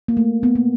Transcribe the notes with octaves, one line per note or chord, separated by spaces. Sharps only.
A#3
A3
B3
A#3